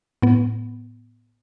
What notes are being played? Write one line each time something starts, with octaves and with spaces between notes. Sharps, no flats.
A2 B3